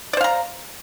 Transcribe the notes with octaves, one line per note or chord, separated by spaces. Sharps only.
C5 D5 F5 A#5